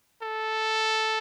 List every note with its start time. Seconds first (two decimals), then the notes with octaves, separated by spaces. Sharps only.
0.22 A4